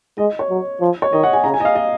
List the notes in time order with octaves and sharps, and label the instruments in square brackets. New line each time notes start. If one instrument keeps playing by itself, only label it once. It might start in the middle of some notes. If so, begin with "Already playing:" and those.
[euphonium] G#3 [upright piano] D#5
[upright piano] C#5
[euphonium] F#3
F3
[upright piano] C#5
[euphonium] D#3 [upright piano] D#5
[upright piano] F#5
G#5
[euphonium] C#3 [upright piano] A#5
[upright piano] G#5
D#5
F5
D#5